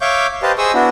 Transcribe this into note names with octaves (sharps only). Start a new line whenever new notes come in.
C#5 E5 F5 C#6 D6 G6
G4 B4 C5 D#5 F5 A5
G#4 C5 D#5 C#6 D#6 E6
B3 D4 E4 F#4